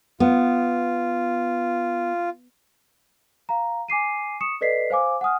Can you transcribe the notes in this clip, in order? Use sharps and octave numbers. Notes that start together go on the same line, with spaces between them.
B3 F4
F5 A#5
G#5 D6 C7 D#7
C#6 D#6 C#7 E7
A4 B4 D5 D#5 B6 C7
C5 F5 G#5 D6
F#5 G#5 D#6 F6